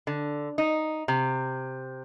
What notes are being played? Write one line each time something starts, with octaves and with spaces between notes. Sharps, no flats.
D3
D#4
C3